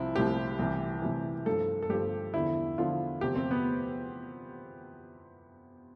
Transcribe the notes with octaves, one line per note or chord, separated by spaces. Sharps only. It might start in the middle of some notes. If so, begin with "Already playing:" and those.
Already playing: C2 C3 F3 E4
C2 C3 F3 G4
C2 C3 E3
C2 C3 E3
G2 F3 A4
A4
G2 F3 G4
E2 D3 F3 E4
E2 D3 F3 F4
E2 C3 F3 G4
C4
B3